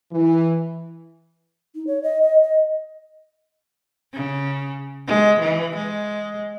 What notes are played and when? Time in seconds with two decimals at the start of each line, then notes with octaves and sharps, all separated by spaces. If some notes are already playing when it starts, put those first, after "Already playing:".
0.11 E3
1.75 D#4
1.87 C#5
2.03 D#5
2.22 D#5
2.43 D#5
4.14 C#3
5.08 G#3
5.40 E3
5.76 G#3